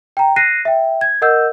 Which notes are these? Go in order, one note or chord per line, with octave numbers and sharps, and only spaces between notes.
G5 A#5
F#6 A#6 C7 D#7
E5 G5
G#6
A#4 D#5 F#5 E6 G6